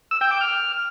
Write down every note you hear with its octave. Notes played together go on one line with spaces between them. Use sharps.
E6
G5
D6
F6